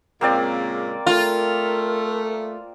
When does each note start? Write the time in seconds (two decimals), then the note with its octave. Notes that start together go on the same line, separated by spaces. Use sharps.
0.21 A#2 C#3 G#3 A#3 C4 D5
1.07 A3 F4 A#4